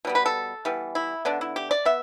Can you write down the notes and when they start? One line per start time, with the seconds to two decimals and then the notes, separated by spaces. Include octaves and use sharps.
0.05 B2 G3 B3
0.15 B4
0.26 A4
0.65 E3 G3 B3
0.95 E4
1.25 D3 B3 D4
1.41 E4
1.56 G4
1.71 D5
1.85 B3 E5